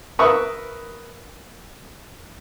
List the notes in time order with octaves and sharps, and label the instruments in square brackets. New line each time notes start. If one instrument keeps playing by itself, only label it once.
[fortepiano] A#4 B4 E5 C#6 D#6